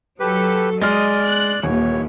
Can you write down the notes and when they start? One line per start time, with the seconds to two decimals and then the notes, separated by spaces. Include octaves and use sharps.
0.20 F#3 G4 A4 B4
0.81 G#3 D5 D#5 F6
1.23 F#6
1.63 D#1 D#2 E3 C#5